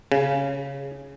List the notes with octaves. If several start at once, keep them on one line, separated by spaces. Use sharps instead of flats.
C#3